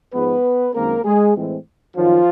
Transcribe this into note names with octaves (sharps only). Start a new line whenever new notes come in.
G#2 F3 G#3 B3 B4
F#2 D#3 G#3 A#3 C4 A#4
G#3 G#4
A2 E3 G#3 C4
F#2 D#3 F3 F#3 F4